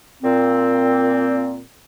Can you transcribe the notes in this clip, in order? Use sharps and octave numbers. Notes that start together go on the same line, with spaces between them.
A#2 C4